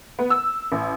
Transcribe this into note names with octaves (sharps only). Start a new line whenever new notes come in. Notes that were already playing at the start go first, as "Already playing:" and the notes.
B3
E6
A1